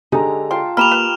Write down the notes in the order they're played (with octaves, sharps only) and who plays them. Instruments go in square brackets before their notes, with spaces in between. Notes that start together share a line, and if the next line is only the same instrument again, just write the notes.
[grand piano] D3 G4 A4 [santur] G#3 A#5 [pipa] D#4
[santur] F4 G5 A5 [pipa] C6
[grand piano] A#3 [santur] G4 G5 A#5 [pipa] B5 [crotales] F6 E7 F7
[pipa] B4 [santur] B5